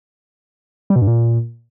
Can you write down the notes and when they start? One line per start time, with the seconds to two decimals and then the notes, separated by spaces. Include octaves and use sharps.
0.90 G3
0.96 B2
1.02 G2
1.07 A#2